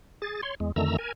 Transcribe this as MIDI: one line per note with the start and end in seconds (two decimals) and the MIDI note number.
0.22 0.41 68
0.22 0.41 93
0.43 0.55 73
0.43 0.55 84
0.60 0.72 40
0.60 0.72 56
0.76 0.97 41
0.76 0.97 50
0.76 0.97 51
0.76 0.97 57
0.76 0.97 82
0.76 0.97 88
0.99 1.12 70
0.99 1.12 80